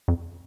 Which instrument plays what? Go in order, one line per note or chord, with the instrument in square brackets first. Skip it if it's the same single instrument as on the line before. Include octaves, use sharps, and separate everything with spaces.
[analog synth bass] F2